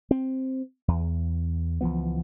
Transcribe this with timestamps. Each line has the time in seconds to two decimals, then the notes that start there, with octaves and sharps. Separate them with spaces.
0.11 C4
0.88 E2
1.81 C#2 E3 F3 B3